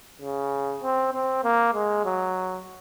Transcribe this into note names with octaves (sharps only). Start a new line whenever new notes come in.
C#3
C4
C4
A#3
G#3
F#3